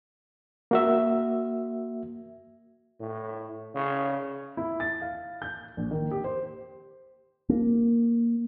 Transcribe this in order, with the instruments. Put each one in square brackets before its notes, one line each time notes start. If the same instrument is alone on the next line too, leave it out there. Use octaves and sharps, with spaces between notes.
[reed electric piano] A#3 F#4 E5
[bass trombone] A2
C#3
[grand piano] E4
A6
F5
G6
A#1
D#3
G4
C5
[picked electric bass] A#3